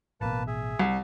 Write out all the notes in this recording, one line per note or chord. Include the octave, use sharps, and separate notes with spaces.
A1 B2 A#3 B4 A5
G#4 E5
C2 G3